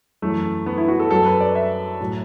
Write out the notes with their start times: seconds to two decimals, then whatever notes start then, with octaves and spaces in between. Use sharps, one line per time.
0.22 F#2 E3 A3
0.66 B3
0.77 E4
0.88 F#4
1.00 A4
1.11 F#2 F#3 A4
1.26 B4
1.41 D5
1.55 E5
2.00 A2 F#3